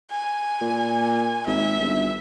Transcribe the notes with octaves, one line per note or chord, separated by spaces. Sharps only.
G#5
A#2
G#1 E5
G1